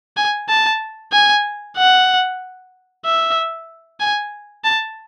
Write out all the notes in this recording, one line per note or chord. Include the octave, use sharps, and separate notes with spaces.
G#5
A5
G#5
F#5
E5
G#5
A5